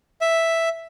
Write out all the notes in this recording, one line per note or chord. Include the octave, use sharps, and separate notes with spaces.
E5